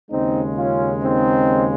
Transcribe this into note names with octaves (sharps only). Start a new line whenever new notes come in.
D#2 C#3 G#3 C4 D#4
C#4 F4
C4 D#4